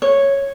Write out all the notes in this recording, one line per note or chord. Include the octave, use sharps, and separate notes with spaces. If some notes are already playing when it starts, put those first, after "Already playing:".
C#5